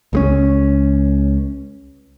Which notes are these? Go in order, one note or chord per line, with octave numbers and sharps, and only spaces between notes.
C#2 G#3 C#4